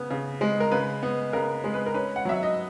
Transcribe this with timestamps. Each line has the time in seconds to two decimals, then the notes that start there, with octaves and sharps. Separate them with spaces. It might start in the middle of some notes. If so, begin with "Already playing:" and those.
Already playing: C#3 B3
0.10 C#3
0.41 G#3
0.60 A#4
0.72 C#3 B4
1.03 B3
1.33 C#3 A#4
1.64 G#3
1.74 B4
1.86 A#4
1.94 C#4 B4
2.16 F#5
2.25 F#3 E5
2.43 D#5